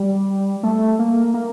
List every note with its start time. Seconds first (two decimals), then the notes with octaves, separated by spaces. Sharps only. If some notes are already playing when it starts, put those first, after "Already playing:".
Already playing: G3
0.63 A3
0.99 A#3
1.34 A#3